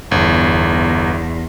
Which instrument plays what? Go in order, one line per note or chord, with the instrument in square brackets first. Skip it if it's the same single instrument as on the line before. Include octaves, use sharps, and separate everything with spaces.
[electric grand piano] G1 [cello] E2